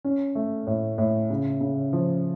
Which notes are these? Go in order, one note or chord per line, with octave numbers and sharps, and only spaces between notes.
C#4
A3
A2
A2
C#3
C#3
F3